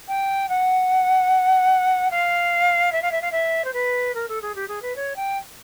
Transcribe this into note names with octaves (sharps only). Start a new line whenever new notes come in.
G5
F#5
F5
E5
F5
E5
F5
E5
C5
B4
A#4
A4
G#4
G4
G#4
B4
C#5
G5